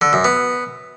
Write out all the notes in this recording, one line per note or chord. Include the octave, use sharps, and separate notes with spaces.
D3
F#2
B3